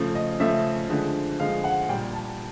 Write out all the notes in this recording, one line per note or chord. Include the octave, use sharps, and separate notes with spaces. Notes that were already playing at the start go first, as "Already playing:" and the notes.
Already playing: C#3 F3 A3
D#5
C#3 F3 A3 E5
D3 F3 G#3
D3 F3 G#3 F5
F#5
A#2 G3 G5
A5